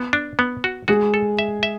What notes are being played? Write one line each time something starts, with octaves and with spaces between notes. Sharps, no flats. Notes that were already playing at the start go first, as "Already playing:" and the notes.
Already playing: B3
D4
B3
F#4
G#3 F#4 G#4
A4
E5
E5